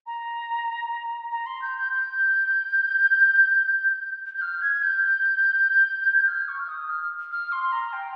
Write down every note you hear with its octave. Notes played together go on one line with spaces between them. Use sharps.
A#5
A#5
C6
G6
G6
G6
G6
F6
G#6
G6
G#6
G6
F6
C#6
F6
D#6
F6
F6
C6
A#5
G5